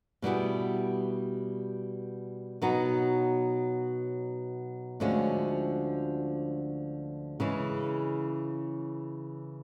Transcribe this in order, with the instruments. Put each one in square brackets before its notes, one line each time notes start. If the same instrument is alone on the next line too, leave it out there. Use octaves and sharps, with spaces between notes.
[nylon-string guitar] B2 G3 B3 E4 G#4
B2 F#3 B3 D#4
D2 D3 F3 G#3 C#4
C#3 E3 G#3